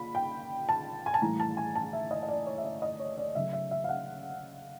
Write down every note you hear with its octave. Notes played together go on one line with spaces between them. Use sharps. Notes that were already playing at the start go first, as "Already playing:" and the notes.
Already playing: A#2 B5
G5
A5
G#5
A5
A2 E3 G3 A#5
A5
G#5
A5
E5
D#5
D#5
D5
C#5
E5
D#5
D#5
C#5
D5
C#3 F#3 A3 E5
E5
E5
F5
F#5